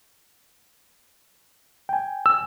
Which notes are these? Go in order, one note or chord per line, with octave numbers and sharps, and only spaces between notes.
G5 G#5
E6